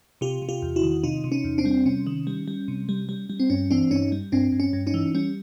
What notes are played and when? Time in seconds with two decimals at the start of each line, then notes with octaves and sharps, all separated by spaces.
0.21 C3 F4 G4
0.42 C3
0.49 F4 G4
0.62 E2
0.76 E4 F#4
0.83 D#3
1.04 C3 D#4 F4
1.24 C3
1.32 C#4 D#4
1.44 E2
1.58 C4 D4
1.65 G3
1.86 C3 C#4
2.06 D#3
2.27 G3
2.48 G3
2.68 C3
2.89 G3
3.09 G3
3.30 G3
3.40 C4
3.50 G2 C#4
3.71 E3 C4 D4
3.91 G2 C#4 D#4
4.12 G3
4.32 G2 C4 D4
4.52 G2
4.60 C#4
4.73 G2
4.87 C#4 D#4
4.94 E3
5.15 G3 C#4